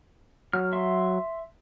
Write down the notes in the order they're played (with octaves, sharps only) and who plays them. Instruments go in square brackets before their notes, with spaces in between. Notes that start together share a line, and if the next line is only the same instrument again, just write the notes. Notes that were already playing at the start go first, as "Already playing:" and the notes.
[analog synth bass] F#3 [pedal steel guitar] F6
[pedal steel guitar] E5 C6